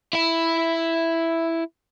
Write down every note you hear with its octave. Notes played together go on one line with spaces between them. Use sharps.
E4 E5